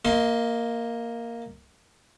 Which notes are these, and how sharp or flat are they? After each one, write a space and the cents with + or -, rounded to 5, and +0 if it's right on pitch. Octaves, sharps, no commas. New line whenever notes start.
A#3 +0 D#5 +35 C6 +0